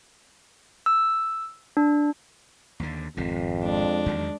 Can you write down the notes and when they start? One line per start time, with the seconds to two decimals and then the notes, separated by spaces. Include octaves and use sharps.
0.86 E6
1.77 D4
2.80 D#2 D3
3.17 G#1 F2 C3
3.61 G#3 D4
4.06 E2 D#3 F#3